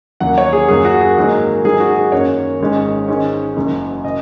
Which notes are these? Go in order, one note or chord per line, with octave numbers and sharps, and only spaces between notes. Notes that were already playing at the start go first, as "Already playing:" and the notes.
D#2 C#3 F#3 A#3 F#5
C#5
G#4
F#2 C#3 F#3 A#3 G#4
F#4
G#4
G#2 D#3 F#3 A#3
G#2 D#3 F#3 A#3 G#4
F#4
G#4
F#2 D#3 A#3 C#4 C#5
G#1 G#2 G#3 C#4
G#2 D#3 G#3 C#4
F#1 F#2 F#3
C#3 D#5